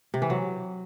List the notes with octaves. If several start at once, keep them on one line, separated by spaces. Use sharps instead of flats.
C3
E3
F#3